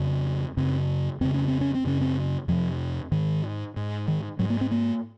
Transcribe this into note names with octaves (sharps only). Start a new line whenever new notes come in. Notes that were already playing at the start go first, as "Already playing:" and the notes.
Already playing: F2 C#3
F#2 C#3 C4
F2 C#3 C4
C#4
C4
C#4
C4
F#2 C#3 C#4
C4
F2 C3 F3
G#2 D#3
G#2
D#3
G#2 F#3
A#3
C4
A#3